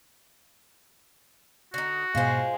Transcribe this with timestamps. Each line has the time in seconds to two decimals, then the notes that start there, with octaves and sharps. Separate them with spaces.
1.74 D3 D#4 F#4
2.15 G#2 B2 G#3 F4 C5